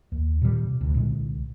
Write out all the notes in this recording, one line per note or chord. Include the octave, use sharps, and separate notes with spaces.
D#2
A#2 D#3 E3 G3
C3
D2
C2 A#2 D3 G#3